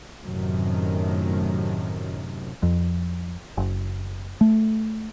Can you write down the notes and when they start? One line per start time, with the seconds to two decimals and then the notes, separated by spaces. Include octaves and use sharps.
0.24 F#2 A2 C3 D#3
2.63 F2
3.57 F#1
4.41 A3